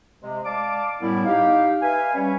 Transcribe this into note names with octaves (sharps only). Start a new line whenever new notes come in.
C3 G#3
D5 F5 A5 D6
F#2 A2 G3 B3 E4
D#4 G4 F5
B4 E5 F5 G#5
G3 C#4 C#5